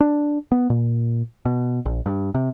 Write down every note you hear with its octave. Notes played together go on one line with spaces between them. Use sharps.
D4
B3
A#2
B2
A#1
G2
C3